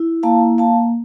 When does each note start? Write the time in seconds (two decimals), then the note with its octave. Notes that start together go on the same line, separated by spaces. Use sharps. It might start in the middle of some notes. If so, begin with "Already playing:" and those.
Already playing: E4
0.23 A#3 F5 A5
0.58 A#3 F5 A5